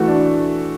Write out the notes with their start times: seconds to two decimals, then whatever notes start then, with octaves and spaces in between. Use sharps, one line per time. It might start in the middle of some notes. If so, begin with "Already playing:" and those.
Already playing: E3 A3 F#4
0.08 D4